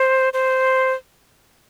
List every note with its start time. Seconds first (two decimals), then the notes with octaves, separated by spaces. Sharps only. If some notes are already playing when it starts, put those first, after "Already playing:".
Already playing: C5
0.33 C5